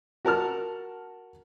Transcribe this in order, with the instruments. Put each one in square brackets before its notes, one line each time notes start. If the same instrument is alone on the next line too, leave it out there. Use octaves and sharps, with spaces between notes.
[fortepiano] F#4 A#4 A5 F6